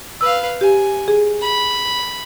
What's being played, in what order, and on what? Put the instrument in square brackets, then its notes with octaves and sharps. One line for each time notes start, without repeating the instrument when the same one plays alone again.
[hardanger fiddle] B4 F5 [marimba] E6
[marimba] G4 [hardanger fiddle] G#5
[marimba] G#4
[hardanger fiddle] B5